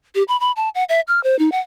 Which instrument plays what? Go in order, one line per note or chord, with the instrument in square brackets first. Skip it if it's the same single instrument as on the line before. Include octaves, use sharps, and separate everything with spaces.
[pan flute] G4
B5
B5
A5
F#5
E5
F6
C5
D#4
F#5